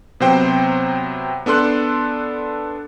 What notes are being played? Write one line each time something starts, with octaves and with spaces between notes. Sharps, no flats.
C3 F#3 B3 C5 G5
B3 D4 A4 C6 F#6